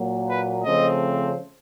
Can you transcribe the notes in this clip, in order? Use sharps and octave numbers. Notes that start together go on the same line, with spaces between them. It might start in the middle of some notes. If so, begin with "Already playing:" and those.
Already playing: A#2 F#3 A#3
B4
C#3 F3 A3 C4 D#5